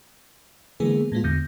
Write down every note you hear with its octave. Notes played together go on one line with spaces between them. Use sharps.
D3 E3 G#3 A#3 B3 G#4
A2 G#3 B3 F4
E2 D3 G6 A#6